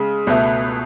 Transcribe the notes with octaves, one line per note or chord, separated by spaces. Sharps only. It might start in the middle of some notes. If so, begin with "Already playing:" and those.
Already playing: C#3 G#3
C#2 B2 A3